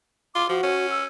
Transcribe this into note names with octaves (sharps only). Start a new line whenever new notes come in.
F4 D6
F3 F#4
C#4
E6